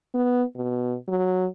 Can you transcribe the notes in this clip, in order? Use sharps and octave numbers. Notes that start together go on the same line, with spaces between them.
B3
B2
F#3